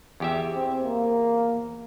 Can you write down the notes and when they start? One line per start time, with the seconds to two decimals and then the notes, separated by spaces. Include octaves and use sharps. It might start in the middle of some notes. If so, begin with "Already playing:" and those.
0.20 E2 G4 E5
0.54 C4
0.84 A#3